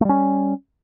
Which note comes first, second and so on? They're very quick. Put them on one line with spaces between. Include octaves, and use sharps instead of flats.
A3 G3 C#4